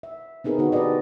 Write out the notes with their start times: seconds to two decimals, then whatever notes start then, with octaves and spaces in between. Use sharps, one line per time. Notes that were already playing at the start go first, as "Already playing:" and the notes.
0.03 E5
0.44 B3 C4 D#4 G#4 A#4 B4
0.59 D3 D#4 F#4 C#5
0.72 D#4 G4 A4 B4 D5 D#5